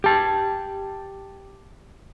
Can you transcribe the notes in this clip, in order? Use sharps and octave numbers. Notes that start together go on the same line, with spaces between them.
G4 A5